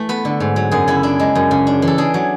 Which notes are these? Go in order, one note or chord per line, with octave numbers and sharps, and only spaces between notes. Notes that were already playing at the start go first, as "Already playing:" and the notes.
Already playing: E3 A3
B3 B4
D3
G#2
F#3
F#2 G#4
C#3 E4
D4 E4
G#3
F#2
C#3
D4
E3
A4
D4 G#4
F#3